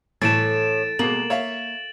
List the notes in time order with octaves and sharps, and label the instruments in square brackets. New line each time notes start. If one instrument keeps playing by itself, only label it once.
[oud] A2 [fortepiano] E3 A3 [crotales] A6 D7 E7
[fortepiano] B2 G#3 [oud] A#3 [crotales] F#7
[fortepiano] C#5 E5 F5